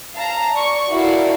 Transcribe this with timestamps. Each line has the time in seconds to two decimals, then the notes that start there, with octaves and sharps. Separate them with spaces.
0.15 F5 A5 A#5
0.53 D5 C#6
0.91 E4 F#4 A4 A#4 D5 F5